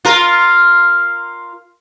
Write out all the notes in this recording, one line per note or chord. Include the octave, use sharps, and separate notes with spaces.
F4 A#4